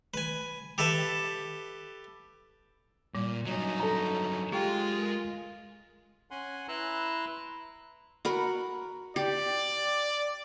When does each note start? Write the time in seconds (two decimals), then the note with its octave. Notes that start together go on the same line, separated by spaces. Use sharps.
0.14 B4 G#5
0.78 G4 A4 B4 E5 A5
3.15 A#2 G3
3.46 G2 F#3 C#4 D#4
3.80 A4 A#5
4.52 G#3 F4 G4 G5
4.97 A#4
6.31 C#4 F#5 G#5 C6
6.68 E4 B4 A#5 C6 E6 F#6
8.25 F#4 A#4 B5
9.16 G4 D5